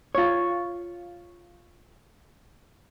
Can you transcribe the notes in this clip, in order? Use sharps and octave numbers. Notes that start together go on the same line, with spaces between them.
F4 C#5